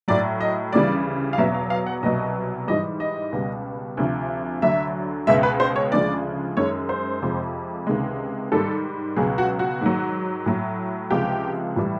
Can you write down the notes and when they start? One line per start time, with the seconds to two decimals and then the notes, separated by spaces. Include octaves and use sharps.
0.08 A2 F#3 D5
0.41 D#5
0.73 D2 C#3 E3 G3 D5
1.33 F5
1.38 E2 B2 F#3 E5
1.55 F5
1.70 F5
1.86 F#5
2.03 C2 B2 F#3 D#5
2.67 G#2 E3 G3 D#5
3.00 D#5
3.32 C#2 B2 G3
3.97 D2 C3 F3
4.62 D2 D3 F#3 E5
5.27 C#2 B2 G#3 E5
5.43 B4
5.60 C5
5.76 C#5
5.92 D2 C#3 F3 G#3 D5
6.57 F#2 D#3 G#3 C#5
6.89 C5
7.22 F2 C3 F3 G#3
7.87 C#2 C3 D#3 G#3
8.52 G#2 D#3 G3 A4
9.16 C#2 B2 F#3 G#4
9.38 F#4
9.59 F#4
9.81 G#2 D#3 F#3
10.46 A2 F#3
11.11 C#2 C3 F3 G#3 G4
11.76 A2 E3 G3